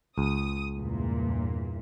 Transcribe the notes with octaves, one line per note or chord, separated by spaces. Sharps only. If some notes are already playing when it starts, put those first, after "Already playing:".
C#2 D#6
E2 G2 A#2